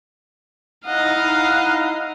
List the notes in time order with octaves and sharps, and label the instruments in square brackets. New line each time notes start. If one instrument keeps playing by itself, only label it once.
[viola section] D#4 E4 A#5 [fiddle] D#5 [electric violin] F5 [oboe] F#5